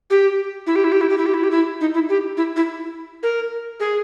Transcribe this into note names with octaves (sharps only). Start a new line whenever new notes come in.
G4
E4
G4
E4
G4
E4
G4
E4
G4
E4
G4
E4
D#4
E4
G4
E4
E4
A#4
G#4